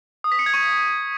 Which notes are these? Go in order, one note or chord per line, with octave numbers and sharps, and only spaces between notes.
D#6
B6
C#7
G#6
C#6